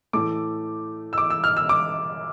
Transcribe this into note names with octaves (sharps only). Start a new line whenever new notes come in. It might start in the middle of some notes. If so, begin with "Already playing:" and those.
A2 E3 A3 D6
E6
D6
E6
F6
E6
D6